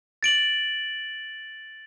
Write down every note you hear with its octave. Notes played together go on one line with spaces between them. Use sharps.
A6 D7 F#7